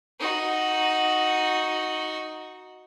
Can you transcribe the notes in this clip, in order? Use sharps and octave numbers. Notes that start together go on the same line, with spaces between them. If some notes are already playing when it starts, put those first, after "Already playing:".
D#4 F#4